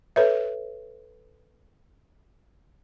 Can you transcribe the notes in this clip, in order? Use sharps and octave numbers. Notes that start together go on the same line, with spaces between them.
A4 B4 C#5 E5